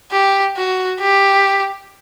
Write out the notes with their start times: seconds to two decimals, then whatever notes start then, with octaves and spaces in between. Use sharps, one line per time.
0.12 G4
0.57 F#4
1.00 G4